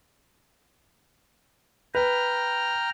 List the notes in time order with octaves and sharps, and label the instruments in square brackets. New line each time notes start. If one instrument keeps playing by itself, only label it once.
[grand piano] B4 [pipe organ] G5 A#5 F6